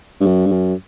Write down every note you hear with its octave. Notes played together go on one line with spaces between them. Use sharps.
G2
F#2
G2
F#2